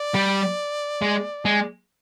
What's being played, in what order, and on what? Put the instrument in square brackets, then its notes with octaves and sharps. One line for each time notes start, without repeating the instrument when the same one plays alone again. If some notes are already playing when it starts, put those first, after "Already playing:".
Already playing: [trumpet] D5
[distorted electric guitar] G3
G#3
G#3